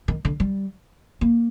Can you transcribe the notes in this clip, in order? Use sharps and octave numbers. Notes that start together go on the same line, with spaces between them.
D#3
D3
G3
A#3